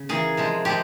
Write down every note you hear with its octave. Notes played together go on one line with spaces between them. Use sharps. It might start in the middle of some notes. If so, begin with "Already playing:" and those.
Already playing: C#3
E3 A#3 G#4
C3 F3 G#3
C3 F3 G#3 G4